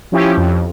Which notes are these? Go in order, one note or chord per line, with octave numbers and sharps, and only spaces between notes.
F3 C#4 E4 G4
F2